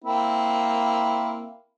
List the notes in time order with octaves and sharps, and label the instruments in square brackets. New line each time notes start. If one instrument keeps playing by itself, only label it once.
[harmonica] A#3 C4 E4